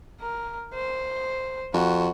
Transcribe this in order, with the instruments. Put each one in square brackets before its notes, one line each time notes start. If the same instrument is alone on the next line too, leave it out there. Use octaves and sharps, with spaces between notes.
[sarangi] A#4
C5
[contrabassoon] F2 [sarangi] F#4